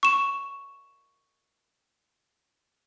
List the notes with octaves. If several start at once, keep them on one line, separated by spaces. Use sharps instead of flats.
C#6 E7